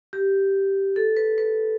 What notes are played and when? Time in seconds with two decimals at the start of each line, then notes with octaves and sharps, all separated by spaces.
0.13 G4
0.96 A4
1.17 B4
1.38 B4